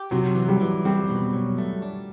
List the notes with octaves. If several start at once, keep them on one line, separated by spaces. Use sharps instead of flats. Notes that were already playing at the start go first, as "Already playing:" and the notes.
Already playing: G4
C3 F#3
E3
G3
E3
G3 C4
B2
F#3
A3
D4